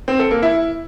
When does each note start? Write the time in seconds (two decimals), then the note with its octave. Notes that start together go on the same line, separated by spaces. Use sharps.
0.08 C4
0.19 A4
0.31 A#3
0.42 E4